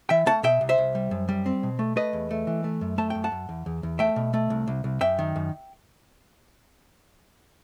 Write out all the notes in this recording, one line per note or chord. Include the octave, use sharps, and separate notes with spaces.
E3 E5 G5
A3 F#5 A5
B2 E5 G5
C2
C5 E5
C2
G3
F#2
G3
C4
B2
A3
A3 B4 D#5
E2
A3
E3
A3
F#2
A3 A5
F#2 G5
F#5 A5
F#2
E2
E2
E2
A3 E5 G5
B2
A3
C2
C2
C2
F#2 E5 G5
D#3
F#2